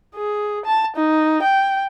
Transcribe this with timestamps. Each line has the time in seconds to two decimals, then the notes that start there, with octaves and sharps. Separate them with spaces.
0.15 G#4
0.65 A5
0.96 D#4
1.42 G5